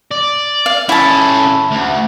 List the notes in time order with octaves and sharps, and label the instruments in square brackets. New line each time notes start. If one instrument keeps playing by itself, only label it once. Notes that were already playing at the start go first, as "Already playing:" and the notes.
[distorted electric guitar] D5
[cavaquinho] F5
[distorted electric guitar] C#4 A4 [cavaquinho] E4 A5
[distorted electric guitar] D2